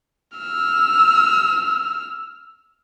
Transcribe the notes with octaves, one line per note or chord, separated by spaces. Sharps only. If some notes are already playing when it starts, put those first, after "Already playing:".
E6 F6